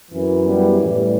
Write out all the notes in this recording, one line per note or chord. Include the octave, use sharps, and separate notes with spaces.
F#2 E3
G3 B3
A2 E3 G3